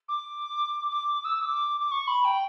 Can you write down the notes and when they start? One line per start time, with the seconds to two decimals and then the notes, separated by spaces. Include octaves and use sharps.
0.08 D6
0.91 D6
1.24 E6
1.41 D6
1.80 D6
1.91 C#6
2.07 B5
2.24 G5